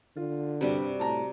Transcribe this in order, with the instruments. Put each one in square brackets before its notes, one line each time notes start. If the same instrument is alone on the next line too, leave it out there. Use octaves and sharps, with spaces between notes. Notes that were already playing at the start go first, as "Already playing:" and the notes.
[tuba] D3 [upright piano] F4
[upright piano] G2 [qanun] C3 G3 F#4
[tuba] A2 [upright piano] A5 A#5